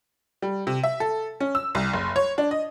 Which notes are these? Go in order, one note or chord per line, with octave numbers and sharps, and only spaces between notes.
G3
C3
E5
A4
C#4
E6
C2
F#1
C#5
D4
D#5